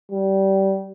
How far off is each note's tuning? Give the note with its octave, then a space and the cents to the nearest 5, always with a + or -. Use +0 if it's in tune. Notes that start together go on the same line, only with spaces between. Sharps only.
G3 -20